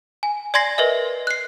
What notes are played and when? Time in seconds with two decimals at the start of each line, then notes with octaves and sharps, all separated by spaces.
0.23 G#5
0.54 D5 G#5 C6 G#6 A#6 C7
0.78 A#4 B4 D#5 E5
1.27 F#6 C7